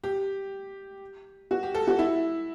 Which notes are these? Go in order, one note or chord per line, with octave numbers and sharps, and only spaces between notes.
G4
F#4
G4
A4
F#4
E4